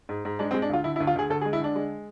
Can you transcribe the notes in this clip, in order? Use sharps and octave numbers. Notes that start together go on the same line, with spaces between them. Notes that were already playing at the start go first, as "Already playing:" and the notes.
G#2
G#2
G#3 D4
C4
G#3
D4
D2 F4
D3 E4
E4
D2
F4
D2 G#4
D2 A4
G#4
G#3
E4
D3 D4
G#3